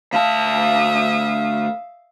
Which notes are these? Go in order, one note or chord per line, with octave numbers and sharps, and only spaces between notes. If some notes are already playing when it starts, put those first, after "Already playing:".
D2 E5 F5 A5 D#6